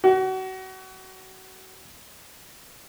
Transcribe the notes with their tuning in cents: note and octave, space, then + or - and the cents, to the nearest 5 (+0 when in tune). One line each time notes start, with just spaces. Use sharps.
F#4 +30